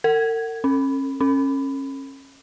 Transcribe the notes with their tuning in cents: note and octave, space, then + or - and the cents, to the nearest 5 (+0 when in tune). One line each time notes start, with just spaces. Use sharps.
A#4 -45
C#4 -35
C#4 -25